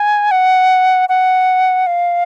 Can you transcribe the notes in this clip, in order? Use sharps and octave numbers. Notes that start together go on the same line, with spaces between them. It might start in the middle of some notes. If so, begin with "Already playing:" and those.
Already playing: G#5
F#5
F#5
F5